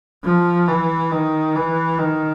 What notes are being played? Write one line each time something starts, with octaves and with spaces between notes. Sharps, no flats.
F3
E3
D#3
E3
D#3